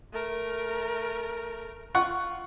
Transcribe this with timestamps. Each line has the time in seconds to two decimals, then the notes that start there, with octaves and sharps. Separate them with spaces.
0.12 A3 A#4
1.94 F4 F#5 C#6